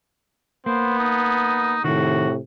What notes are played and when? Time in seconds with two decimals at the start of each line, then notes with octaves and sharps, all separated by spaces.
0.66 A#3 B3 C5
0.99 D#4
1.84 A2 C3 D#3 F#4